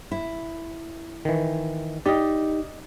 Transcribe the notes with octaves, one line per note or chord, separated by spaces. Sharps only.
E4
D#3 E3
D#4 G4 D5 D#5